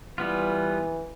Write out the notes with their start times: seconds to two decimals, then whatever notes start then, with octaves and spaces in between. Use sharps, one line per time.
0.18 E3 G3 B3 F4